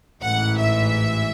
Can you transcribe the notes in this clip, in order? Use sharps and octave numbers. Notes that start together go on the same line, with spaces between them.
A1 G#2 E3 F#5
E5